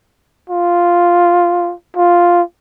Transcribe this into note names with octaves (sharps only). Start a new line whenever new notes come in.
F4
F4